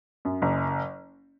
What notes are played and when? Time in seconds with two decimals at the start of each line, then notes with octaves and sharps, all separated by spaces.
0.25 F#2
0.42 F#1